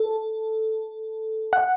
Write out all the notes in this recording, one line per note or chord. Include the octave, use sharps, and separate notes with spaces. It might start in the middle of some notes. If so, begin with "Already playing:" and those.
Already playing: A4
F#5